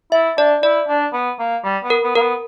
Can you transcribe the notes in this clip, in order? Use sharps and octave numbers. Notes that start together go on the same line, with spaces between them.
E4 E5
D4 D5
E4 D5
D4
B3
A#3
G3
B3
A#4
B3
A#3 A#4
B3